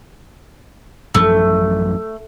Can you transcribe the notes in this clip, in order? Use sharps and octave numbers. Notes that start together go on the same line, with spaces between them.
A1 F#2 F3 A3